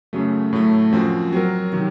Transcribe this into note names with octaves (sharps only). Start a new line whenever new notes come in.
F#2 C#3 F#3 A3
A2 F#3 A3
F#2 F3 C4 F#4
F#3 C4 F#4 A#4
C3 D#3 F#3